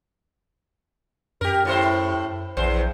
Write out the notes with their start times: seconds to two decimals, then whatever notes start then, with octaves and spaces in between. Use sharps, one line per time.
1.41 F#2 G4 A#4
1.65 A2 E4 C5
2.57 A#1 E2 C5